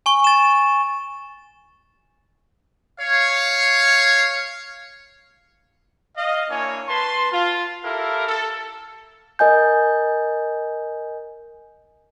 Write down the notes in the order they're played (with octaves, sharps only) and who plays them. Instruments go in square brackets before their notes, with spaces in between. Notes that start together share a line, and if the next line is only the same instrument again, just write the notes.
[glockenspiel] G#5 C#6
A6 E7
[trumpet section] C#5 F5
D#5 F5
A#3 D4 E4 C#5 G#5
B4 A5 C6
F4
E4 G4 A4 A#4 F5
A4
[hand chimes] A#4 D#5 G#5 G6